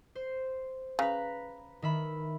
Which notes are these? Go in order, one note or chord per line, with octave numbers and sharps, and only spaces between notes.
C5
C#3 B4 A#5
D#3 E5 B5